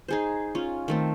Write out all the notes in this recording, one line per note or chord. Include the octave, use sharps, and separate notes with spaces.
D#4 G#4 C5
C#4 F4
D#3 A3 C4